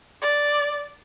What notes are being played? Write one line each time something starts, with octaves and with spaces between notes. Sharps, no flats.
D5